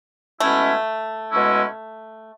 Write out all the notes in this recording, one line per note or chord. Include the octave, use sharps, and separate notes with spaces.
B2 G#3 A3 C#4 E4
B2 G#3 C#4 E4